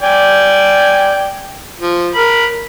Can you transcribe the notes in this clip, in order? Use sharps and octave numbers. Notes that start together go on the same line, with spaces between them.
D5 G5 G#5
F3
A#4 B5